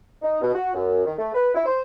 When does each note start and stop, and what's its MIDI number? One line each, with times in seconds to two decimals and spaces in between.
0.22 0.42 63
0.42 0.52 47
0.54 0.71 66
0.74 1.02 42
1.05 1.14 51
1.18 1.30 57
1.34 1.51 71
1.54 1.65 64
1.66 1.81 72